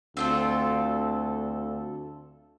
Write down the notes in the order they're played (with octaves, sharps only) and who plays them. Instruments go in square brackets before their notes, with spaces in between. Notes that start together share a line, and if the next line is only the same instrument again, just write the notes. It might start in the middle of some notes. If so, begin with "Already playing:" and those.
[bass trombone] D2 [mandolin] C4 F4 A4